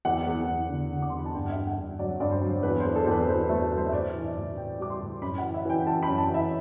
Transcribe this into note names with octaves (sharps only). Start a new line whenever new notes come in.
E2 F#5
E2
E2
D3
D3
D6
E2 C6
B5
A5
G2 G5
F#5
E5
G2
F#5
G2
F#3 D5
G2 D5
C5
F#3
E2 B4
E2 C5
A4
C5
E2 B4
E2 C5
B4
A3
B4
F#3 C5
E5
A2 D5
E3
E5
A2
E3 G5
G3 D6
C6
A2
F#2 B5
E3 F#5
E5
E3 G5
E3 A5
B5
F#2
A5
E3 E5